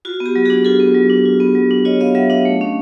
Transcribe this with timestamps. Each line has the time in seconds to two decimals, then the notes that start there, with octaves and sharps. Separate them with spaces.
0.05 F4 F#4
0.20 B3
0.26 G4
0.36 F#3
0.45 D4 F#4 G#4
0.65 F4 G4 A4
0.80 B3
0.95 F#3
1.10 D4
1.25 F4
1.40 B3
1.55 F#3
1.71 D4
1.85 F4 C#5 D#5
2.00 B3 D#5 F5
2.15 F#3 E5 F#5
2.30 D4 D#5 F5
2.45 A3
2.61 C#4